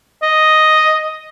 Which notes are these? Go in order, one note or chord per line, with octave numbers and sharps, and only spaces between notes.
D#5